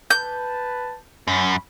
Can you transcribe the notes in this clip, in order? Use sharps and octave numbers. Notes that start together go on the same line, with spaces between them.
B4 A5 G6
F#2 C#4 B5